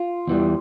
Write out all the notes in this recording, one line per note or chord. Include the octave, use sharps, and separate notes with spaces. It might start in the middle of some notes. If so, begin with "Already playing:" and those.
Already playing: F4
E2 E3 G3